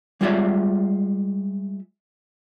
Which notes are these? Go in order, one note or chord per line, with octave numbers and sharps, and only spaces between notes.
G3 G#3 F4 C#5 D5 E5